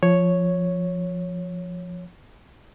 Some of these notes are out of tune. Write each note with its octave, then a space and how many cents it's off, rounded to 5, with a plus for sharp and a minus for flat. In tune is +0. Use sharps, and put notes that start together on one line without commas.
F3 +0 C#5 +0